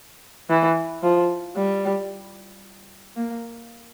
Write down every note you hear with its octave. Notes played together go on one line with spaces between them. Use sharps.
E3
F3
G3
A#3